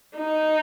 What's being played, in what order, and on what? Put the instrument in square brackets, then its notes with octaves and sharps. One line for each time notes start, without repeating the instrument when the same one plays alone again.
[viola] D#4